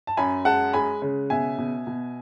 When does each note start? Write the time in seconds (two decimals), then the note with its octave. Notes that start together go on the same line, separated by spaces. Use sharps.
0.07 A5
0.17 F#2 G#5 B5
0.45 G#3 F#5 A5
0.73 G#3 G#5 B5
1.02 C#3
1.30 B2 E5 G#5
1.58 B2
1.87 B2